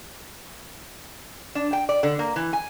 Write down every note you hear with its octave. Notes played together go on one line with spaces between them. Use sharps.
D4
G5
D5
D3
A#3
E3
G#5